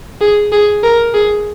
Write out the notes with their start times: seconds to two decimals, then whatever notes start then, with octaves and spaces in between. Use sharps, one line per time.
0.21 G#4
0.52 G#4
0.83 A#4
1.14 G#4